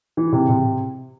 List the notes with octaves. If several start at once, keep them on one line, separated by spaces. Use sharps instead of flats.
E3
C3
C3